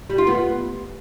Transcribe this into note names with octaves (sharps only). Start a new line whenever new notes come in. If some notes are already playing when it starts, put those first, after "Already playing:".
G3
F4
B3